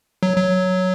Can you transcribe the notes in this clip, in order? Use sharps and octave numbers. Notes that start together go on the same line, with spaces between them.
F#3
F#3